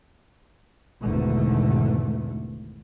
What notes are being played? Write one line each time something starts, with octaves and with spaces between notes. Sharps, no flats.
G#1 E2 G#2 B2 D3 A3